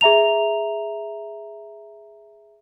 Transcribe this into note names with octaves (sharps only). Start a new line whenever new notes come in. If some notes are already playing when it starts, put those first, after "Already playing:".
G#4 E5 A#5 F7